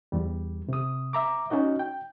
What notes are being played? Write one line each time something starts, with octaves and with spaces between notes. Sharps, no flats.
E2 G3
C3 D#6
E5 A#5 D6
C#4 D#4 F#4 D#5
G5